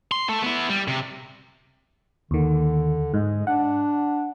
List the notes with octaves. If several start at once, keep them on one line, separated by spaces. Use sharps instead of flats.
C6
A3 A4
B3 E4
G3
C3
D#2 D3 D#3
G#2 G#3
D4 F#5